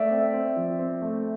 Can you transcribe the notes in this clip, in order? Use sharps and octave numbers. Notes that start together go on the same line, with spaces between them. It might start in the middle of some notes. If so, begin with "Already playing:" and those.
Already playing: A3 D5 E5
C4
C4
F3
C4
A3